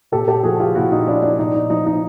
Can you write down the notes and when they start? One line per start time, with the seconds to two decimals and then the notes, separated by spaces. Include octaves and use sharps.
0.12 A#2 G4 A4
0.28 G4 A4
0.43 F3 F#4 G#4
0.60 F4 G4
0.75 A#2 E4 F#4
0.92 D#4 F4
1.07 F3 D4 E4
1.22 D4
1.39 A#2 D#4
1.54 D#4
1.70 F3 D#4
1.87 D#4